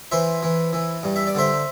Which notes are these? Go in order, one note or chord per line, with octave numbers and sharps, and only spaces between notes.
E3 C5 E5
E3
E3
G2
E5
D5
D3 C5 E5